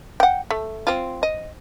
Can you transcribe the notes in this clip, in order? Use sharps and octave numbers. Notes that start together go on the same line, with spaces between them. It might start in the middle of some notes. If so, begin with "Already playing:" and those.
F#5 G5
A3
C4 F4
D#5